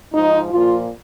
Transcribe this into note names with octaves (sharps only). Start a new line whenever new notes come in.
G#2 F3 D#4
A#2 F3 F4